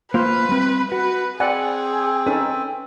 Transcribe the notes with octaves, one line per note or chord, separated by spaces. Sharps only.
A#3 F4 B4 C5 F5
G3 C4
F#4 B4
C4 G#4 D5 F#5 G#5
C#4 D#4 A4 B4